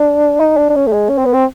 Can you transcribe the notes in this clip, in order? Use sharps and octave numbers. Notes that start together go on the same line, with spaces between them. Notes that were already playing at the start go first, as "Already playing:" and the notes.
Already playing: D4
D#4
D4
D4
C#4
A3
G#3
C#4
C4
B3
C4